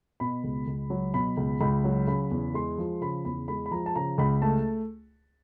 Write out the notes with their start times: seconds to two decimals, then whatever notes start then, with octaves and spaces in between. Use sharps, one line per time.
0.20 B2 B5
0.44 C#2
0.67 C#2
0.90 F#3
1.14 B2 B5
1.37 C#2
1.61 C#2 B5
1.84 F#3
2.07 C#3 B5
2.31 E2
2.54 G#3 C6
2.78 F3
3.01 C#3 B5
3.25 E2 B5
3.48 G#3 B5
3.66 B5
3.72 F3 A#5
3.86 A5
3.96 C#3 A#5
4.18 C#2 B5
4.42 A3 A5